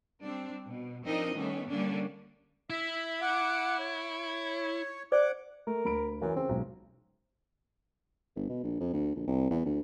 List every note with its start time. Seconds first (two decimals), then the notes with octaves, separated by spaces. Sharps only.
0.22 G3 C4 D4
0.67 B2
1.06 F3 C4 D4 D#4 A#4 D#5
1.36 D#3 G3 A3 B3 C#4
1.70 D3 G3 A#3 C#4 D4
2.70 E4 E5
3.21 F#5 D6
3.79 C#5
5.12 C5 D5 F#5 D6
5.67 A3 A#4
5.85 D2 B5 D7
6.22 F#2 E3
6.36 C#3 C4
6.49 B1 G#2
8.36 G1
8.49 B2
8.63 A#1
8.80 F2
8.93 D2
9.15 A#1
9.27 C2
9.50 E2
9.66 D2